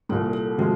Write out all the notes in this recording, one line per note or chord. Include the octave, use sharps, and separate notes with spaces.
C2 A#2 G3 A4
A4
C3 F3 G#3 F#4